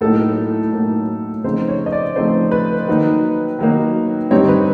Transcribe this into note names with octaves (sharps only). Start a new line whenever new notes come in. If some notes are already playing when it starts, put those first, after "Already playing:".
A2 F#3 A#3 D#4 A4
A2 F#3 A#3 D#4
C#3 F3 A3 C4 D#4 C5
C#5
D#5
D5
C#3 F3 A3 C4 D#4 C5
B4
D#3 F#3 A#3 D#4
D#3 F#3 A#3 D#4
G2 D3 G3 C4 D#4 C#5
B4